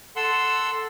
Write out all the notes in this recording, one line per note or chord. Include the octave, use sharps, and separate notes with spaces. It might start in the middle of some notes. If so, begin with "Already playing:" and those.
A4 F#5 C6 E6